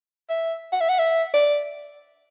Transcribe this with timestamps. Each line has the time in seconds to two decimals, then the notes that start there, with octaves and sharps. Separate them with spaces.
0.29 E5
0.72 F#5
0.80 E5
0.89 F#5
0.99 E5
1.34 D5